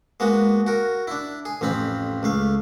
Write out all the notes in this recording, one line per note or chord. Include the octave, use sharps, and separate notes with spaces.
G#3 A#3 B3 F#4
F#4 A#4
D4 E4
G#4
A1 F2 C4 F4 B5
C#2 A3 F5